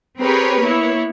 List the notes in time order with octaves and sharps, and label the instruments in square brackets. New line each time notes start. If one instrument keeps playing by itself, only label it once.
[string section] C4 G4 G#4 A#4 B4 C#5
A#3 B3 E4 C#5